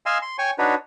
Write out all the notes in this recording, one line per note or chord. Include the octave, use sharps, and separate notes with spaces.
D#5 F5 G#5 C6 E6
C6
C#5 G5 G#5 C#6
D4 D#4 F#4 B4 C#5